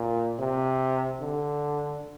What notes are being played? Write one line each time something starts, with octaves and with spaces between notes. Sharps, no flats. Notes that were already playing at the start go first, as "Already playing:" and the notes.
Already playing: A#2
C3
D3